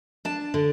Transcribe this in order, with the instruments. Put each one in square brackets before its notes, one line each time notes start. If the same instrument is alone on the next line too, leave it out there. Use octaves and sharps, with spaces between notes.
[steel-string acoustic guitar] D4 A5
D3